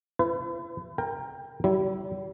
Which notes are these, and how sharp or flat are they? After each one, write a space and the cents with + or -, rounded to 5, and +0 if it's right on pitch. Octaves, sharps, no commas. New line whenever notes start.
E4 +40 B4 +40
A#4 +0 G5 +25
G3 -45 E4 +0